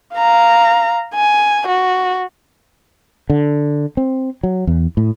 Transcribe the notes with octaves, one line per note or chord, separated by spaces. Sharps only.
F5 A#5
G#5
F#4
D3
C4
F#3
E2
A2